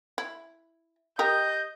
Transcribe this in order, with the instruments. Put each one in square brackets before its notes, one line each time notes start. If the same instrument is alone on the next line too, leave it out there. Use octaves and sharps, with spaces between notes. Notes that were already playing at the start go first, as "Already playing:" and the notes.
[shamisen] E4
[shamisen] G4 A#4 [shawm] D#5 [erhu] G6